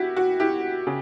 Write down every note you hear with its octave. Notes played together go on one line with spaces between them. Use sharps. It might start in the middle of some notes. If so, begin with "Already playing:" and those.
Already playing: E4 F#4 G4
F#4
E4 G4
C#3